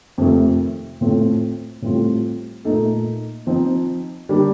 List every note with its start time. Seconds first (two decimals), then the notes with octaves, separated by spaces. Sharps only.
0.18 F2 C3 D#3 A3
1.01 A2 A3 C4 F4 A4
1.82 A2 G3 C4 F4 A4
2.65 A#2 A3 D#4 A4
3.47 F3 C4 D#4
4.29 D3 G3 A#3 D4 G4